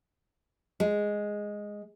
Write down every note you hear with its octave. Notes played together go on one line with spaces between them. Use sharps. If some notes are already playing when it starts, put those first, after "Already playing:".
G#3